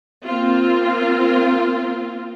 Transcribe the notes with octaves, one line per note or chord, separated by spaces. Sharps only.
A#3 C4 F4